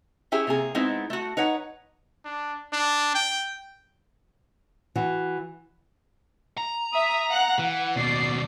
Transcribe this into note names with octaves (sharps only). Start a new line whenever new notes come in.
C#4 E4 G4 G#4 C#5 E5
C3 A#3 G#4
G#3 B3 C4 D#4 E4
A3 F#4
D#4 B4 C#5 F#5
D4
D4
G5
E3 F#4
A#5
E5 D#6
F5 F#5 F#6
E3 F#5
D#2 B2 D5 C7